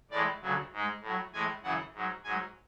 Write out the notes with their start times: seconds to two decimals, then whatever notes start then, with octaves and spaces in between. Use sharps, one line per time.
0.11 A2 E3 G#3 D5
0.42 D2 C#3 F#3
0.73 G#2 G#3
1.02 A2 F#3
1.33 A2 E3 G#3 G#5
1.63 F#2 C#3 E3 F#5
1.94 G#2 F#3
2.24 G#2 F#3 G#5